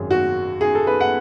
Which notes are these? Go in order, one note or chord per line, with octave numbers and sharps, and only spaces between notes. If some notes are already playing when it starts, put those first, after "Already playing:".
Already playing: G#1 F#2 D#3 G#4
F#4
G#4
A4
B4
F#5